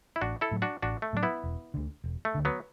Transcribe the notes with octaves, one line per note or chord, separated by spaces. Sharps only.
E4
A1 D4 F#4
E4 A4
A2 F#3
D4 F#4
A1 D4 F#4
A3
A2 F#3 D4
B3 E4
E1
D2 D3
E1
A3
D2 D3
F#3 B3